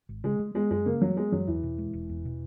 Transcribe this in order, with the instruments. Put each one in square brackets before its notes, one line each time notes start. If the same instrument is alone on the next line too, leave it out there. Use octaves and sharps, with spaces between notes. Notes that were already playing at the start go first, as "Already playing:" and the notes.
[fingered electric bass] G#1
[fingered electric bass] C#3 [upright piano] G#3
[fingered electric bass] G#3
[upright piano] G#3 [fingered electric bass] B3
[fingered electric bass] F#2 [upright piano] G#3
[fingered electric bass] C#3 [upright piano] A#3
[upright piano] F#3 [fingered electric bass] G#3
[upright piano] G#3 [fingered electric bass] B3
[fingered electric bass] F#2 [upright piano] F#3
[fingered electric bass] E2 [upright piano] E3
[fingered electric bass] B2
G#3
E1
E2
B2